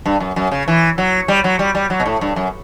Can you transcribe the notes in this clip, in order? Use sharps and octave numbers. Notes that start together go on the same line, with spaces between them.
G2
F#2
F#2
C#3
E3
F#3
G3
F#3
G3
G3
F#3
B2
A2
G2
F#2